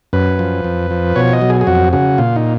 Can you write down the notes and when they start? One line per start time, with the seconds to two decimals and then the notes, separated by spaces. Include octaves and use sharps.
0.13 F#2 B4
0.39 F3
0.64 F2
0.91 F3
1.16 B2 C#5
1.33 D#5
1.42 F#3
1.50 G#4
1.61 G#4
1.67 F2 F#4
1.93 C#3 F#4
2.18 A#2 F4
2.36 D#4